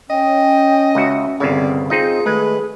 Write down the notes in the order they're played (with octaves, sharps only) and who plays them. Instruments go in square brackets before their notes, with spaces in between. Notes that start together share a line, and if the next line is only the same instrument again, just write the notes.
[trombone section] C#4 [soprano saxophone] D#5 [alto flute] G5
[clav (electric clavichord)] C#2 F#4 [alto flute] E5
[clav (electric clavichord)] G1 C2 C#3 [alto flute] C4 [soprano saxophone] D5
[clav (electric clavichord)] C4 D#4 D#5 [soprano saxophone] F4 [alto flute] G#4
[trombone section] D#3 A3 [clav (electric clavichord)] G#3 [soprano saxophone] B4